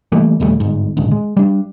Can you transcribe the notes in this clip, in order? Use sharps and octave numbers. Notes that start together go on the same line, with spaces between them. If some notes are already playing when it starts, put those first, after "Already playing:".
E3 G3 A3 A#3
A#1 D#2 G3 A3
G1 G#2
D#1 G#1 C#2 D3
G#3
G3 D4